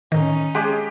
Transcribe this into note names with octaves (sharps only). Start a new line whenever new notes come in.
A2 D#3 C#4 D#4
G#3 G4